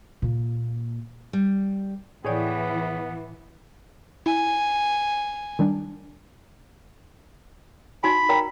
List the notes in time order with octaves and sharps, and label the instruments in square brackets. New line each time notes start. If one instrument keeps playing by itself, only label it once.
[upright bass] A#2 A#3
[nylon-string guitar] G3
[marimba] A2 D5 [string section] E3 [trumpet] B3 [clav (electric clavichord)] G#4 C#5 G5
[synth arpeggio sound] E4 [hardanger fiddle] G#5
[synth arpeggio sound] D#3 G3 D4
[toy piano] D#4 F#4 G#5 [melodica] B5
[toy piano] A#4 G5 A#5